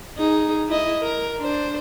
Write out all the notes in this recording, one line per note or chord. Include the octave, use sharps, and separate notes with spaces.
D#4 G#4
E4 D#5
A#4
D4 C5